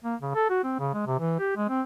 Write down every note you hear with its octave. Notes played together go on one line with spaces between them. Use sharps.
A#3
C#3
A4
F#4
C4
C#3
G#3
C3
E3
G4
G#3
C4